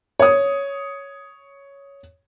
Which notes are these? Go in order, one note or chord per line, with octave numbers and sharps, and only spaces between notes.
C#5 D#6